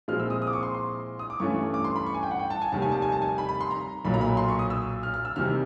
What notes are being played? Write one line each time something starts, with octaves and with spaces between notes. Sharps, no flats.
A#2 F3 G#3 C4 E4 F6
E6
D#6
D#6
D6
C#6
C6
C6
D#6
D6
G2 E3 A3 C#4 C#6
D6
C6
B5
C#6
G#5
G5
F#5
G5
A5
G#5
F1 D#2 D#3 G3 A5
G#5
A5
G#5
A5
G#5
B5
B5
C6
A#5
B1 A#2 F#3 B5
A#5
B5
C6
C#6
D#6
E6
F6
F6
E6
E2 C3 D#3 G3 F6